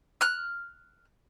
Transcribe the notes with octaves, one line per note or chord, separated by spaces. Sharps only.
F6 F#6